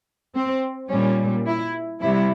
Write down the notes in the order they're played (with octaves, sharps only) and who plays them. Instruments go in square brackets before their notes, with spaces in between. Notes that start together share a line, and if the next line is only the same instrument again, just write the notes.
[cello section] C4
A#2 G3 C#4
E4
C3 G3 E4